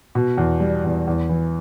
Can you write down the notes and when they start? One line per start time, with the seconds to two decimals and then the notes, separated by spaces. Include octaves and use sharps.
0.15 B2
0.38 E2
0.60 G3
0.84 E2
1.07 E2
1.29 E3